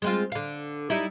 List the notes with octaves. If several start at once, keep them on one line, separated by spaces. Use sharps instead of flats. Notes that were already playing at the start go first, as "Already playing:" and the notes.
G#3 C4 F4
D3 F5
G3 D#4 E4